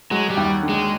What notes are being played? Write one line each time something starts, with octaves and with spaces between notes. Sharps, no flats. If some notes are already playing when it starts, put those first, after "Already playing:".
F#3 G#3
G3
D#2
D3
G#3